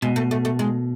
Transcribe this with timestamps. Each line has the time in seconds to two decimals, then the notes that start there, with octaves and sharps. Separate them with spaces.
0.02 B2 G#3
0.16 A3
0.31 A3
0.45 A3
0.59 G#3